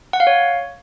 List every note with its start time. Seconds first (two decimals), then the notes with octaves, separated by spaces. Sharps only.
0.13 F#5
0.20 F5
0.27 C#5